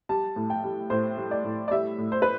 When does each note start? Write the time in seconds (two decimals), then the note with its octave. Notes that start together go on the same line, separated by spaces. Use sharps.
0.09 G3 A5
0.36 A2
0.50 G5
0.64 G3
0.90 A2 C5
1.18 G3
1.31 D5
1.44 A2
1.68 D5
1.71 G3 E5
1.98 A2
2.12 C5
2.22 B4